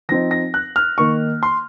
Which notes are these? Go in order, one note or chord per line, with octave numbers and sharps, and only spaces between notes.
F3 C4 D#4 A#6
A#6
F#6
F6
D#3 A#3 D#4 C#6
C6